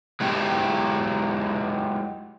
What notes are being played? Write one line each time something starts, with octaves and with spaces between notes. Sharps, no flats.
F#3 G#3 E4 G4